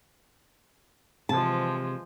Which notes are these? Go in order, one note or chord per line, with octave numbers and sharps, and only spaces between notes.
C3 E3 F3 G#3 A5